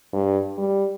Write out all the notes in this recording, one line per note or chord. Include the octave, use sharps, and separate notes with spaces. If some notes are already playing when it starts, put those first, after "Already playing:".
G2
G3